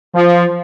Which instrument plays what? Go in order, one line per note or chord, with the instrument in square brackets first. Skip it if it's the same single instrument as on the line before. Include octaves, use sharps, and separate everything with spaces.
[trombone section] F3